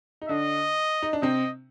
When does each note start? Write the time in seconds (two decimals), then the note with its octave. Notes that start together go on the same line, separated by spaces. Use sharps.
0.22 D#4
0.29 D3 D4 D#5
1.02 D#4
1.13 D4
1.22 C3 C4 D#5